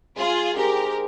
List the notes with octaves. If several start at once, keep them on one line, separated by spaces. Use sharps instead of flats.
G#3 F4 G#4
D#4 G4 G#4 A#4 C5